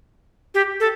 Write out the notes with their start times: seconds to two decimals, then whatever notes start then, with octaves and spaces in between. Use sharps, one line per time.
0.54 G4
0.80 A4